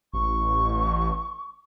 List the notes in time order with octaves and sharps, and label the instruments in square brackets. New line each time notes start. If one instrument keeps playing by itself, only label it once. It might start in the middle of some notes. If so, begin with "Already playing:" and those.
[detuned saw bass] A1 [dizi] C#6